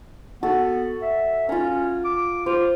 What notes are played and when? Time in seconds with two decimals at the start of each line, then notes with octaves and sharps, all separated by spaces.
0.43 B3 F#4 A4
1.02 E5
1.49 C#4 F4 A#5
2.05 D6
2.46 F4 C5